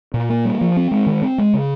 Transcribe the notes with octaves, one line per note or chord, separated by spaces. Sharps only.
A#2
A#3
G3
F3
C4
G#3
D#3
C4
G#3
C#3